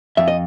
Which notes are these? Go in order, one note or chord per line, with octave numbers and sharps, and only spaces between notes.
F2 E5
D#5